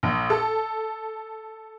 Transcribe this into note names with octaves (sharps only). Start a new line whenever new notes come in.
A#1
A4